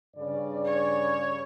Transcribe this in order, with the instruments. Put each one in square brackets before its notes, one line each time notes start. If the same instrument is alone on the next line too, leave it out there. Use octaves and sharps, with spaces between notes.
[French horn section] G2 C#3 D5
[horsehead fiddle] C#5